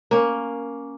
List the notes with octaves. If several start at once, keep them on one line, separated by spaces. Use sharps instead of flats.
A#3 C#4